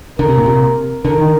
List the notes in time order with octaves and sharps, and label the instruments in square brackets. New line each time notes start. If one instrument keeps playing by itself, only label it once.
[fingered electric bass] D3 [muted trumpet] A#4
[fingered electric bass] C3
A#2
C3
[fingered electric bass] D3 [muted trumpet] A#4
[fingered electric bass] D#3